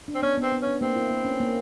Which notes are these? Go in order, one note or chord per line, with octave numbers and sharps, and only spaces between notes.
D4
C4
B3 C#4
B3 C4
B3
C#4
D4
A#3 C4
E4
A#3
C#4
A#3